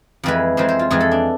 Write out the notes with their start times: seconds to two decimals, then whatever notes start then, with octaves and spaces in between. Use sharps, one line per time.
0.23 F2 E3 G#3 B4
0.57 F2 E3 G#3 C5
0.69 C5
0.79 F4
0.91 F2 E3 G#3 G#4
1.00 A4
1.11 D4